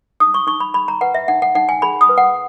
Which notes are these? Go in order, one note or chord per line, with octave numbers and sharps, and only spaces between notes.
D#4 D#6
C#6
D#4 C#6
B5
G#4 B5
A#5
B4 F#5
E5
D#4 F#5
F#5
D#4 F#5
G#5
G#4 B5
D#6
B4
F#5